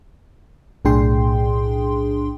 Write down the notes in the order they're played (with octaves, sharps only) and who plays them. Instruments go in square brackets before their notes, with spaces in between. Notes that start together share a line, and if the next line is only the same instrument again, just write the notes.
[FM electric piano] B1 A2 D4 G#4 G5 C6